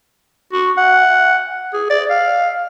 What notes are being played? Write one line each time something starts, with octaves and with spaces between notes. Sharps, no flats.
F#4
F#5
G#4
D5
F5